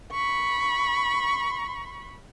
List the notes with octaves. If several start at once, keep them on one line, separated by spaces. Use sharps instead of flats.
B5 C#6